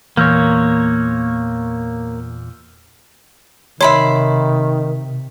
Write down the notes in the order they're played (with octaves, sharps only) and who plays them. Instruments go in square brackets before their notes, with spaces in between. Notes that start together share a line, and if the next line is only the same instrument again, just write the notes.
[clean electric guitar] E2 A#2 [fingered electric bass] E3 [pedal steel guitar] A#3 C#5 [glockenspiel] E6 F6 G6
[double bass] C3 [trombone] D#3 [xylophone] C#5 [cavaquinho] E5 B5 C6